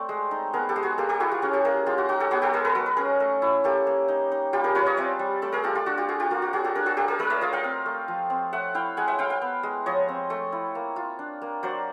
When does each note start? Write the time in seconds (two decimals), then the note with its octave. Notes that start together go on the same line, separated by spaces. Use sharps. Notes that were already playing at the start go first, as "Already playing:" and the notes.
Already playing: A3 C4 C5 D5
0.09 G#3
0.31 D#4
0.53 B3 G#4 A#4
0.69 G4 A4
0.76 G#3
0.83 F#4 G#4
0.98 A#3 G4 A4
1.09 G4 A4
1.20 E4 F#4 G#4
1.31 F4 G4
1.42 C#4 F#4 G#4
1.53 G4 A4
1.65 A#3 G#4 A#4
1.86 G#3 F4 G4
1.98 F#4
2.09 D#4 F#4
2.20 G4 A4
2.31 B3 F#4 G#4
2.42 G4 A4
2.53 G#3 G#4 A#4
2.65 A4 B4
2.75 F#3 A#4
2.86 B4
2.97 C#4 G#4 A#4
3.20 A3
3.42 E4
3.64 A#3 G4 A4
3.87 A#3
4.08 D#4
4.32 D#4
4.53 G3 F4 G4
4.64 G#4 A#4
4.75 F4 B4 C#5
4.86 C#5 D#5
4.97 C4 D5 E5
5.19 G3
5.42 A3 D5 E5
5.52 G#4 A#4
5.64 F4 G4 A4
5.75 F4 G4
5.86 D4 F#4
5.97 F4 G4
6.08 A3 F#4 G#4
6.20 F4 G4
6.30 A#3 F4
6.42 F#4
6.53 F4 F#4 G#4
6.64 G4 A4
6.75 D4 G#4 A#4
6.86 F#4 G#4
6.97 A#3 G4 A4
7.08 G#4 A#4
7.19 A3 G#4 A#4
7.30 D5 E5
7.41 F4 D#5 F5
7.53 F5 G5
7.64 C4
7.86 A3
8.08 F3
8.30 C4
8.53 A3 E5 F#5
8.74 E4 F5 G5
8.97 G#3 F#5 G#5
9.08 E5 F#5
9.19 E4 F5 G5
9.30 F5 G5
9.42 B3
9.63 G#3
9.86 F3 C#5 D#5
10.09 C4
10.30 A3
10.52 E4
10.75 A#3
10.96 F4
11.19 D4
11.42 A#3
11.63 F#3 C5 D5